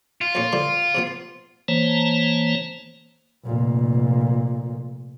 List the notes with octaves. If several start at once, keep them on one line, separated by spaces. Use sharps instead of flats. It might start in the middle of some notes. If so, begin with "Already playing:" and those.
F4
F2 A#2 C#4
D3 F3 G3
C3 F3 B3
E3 A#3 C5 C#5 A5 A#5
F1 A#2